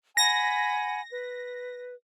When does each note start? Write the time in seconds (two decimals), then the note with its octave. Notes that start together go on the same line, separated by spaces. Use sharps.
0.17 F#5 G#5 B5 A#6
1.12 B4